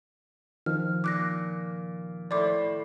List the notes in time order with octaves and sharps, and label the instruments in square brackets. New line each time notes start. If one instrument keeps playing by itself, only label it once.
[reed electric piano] D#3 F3 [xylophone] F6
[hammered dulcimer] A#2 [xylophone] D6 F#6 A#6
[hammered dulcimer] A2 C5 B5 [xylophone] D5 D6